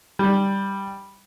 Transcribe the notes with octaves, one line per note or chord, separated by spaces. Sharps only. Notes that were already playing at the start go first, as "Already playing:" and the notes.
G3